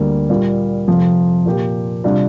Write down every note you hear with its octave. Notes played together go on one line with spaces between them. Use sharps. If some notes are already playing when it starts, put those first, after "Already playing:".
Already playing: D2 D3 G3 A#3
A#2 G3 A#3 F4
F2 C3 F3
A#2 A#3 G4
C3 G3 D4 F4